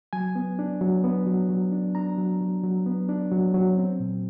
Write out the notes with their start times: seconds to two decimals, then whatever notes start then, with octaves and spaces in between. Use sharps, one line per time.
0.13 F#3 G#5
0.35 B3
0.59 D4
0.81 F#3
1.04 B3
1.26 F#3
1.49 F#3
1.72 D4
1.95 D4 A#5
2.18 F#3
2.41 F#3
2.63 F#3
2.86 B3
3.09 D4
3.31 F#3
3.54 F#3
3.77 C4
4.00 A#2